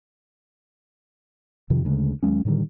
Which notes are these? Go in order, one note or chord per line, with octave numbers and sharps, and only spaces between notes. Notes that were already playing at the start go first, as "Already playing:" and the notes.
F2 C3 D#3 F3
D2 C#3 G#3
D#2 F#3 G#3 C#4
A2 D3 D#3 G3